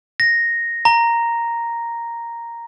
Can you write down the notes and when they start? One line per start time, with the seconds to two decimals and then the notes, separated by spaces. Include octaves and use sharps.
0.20 A#6
0.85 A#5